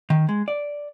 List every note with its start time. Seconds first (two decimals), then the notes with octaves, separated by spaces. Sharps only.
0.10 D#3
0.29 G#3
0.48 D5